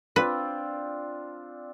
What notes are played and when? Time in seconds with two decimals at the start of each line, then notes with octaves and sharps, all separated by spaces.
0.16 C4 D4 F4 B4